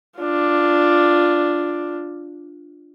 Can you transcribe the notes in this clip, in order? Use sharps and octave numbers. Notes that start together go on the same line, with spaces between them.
D4 F4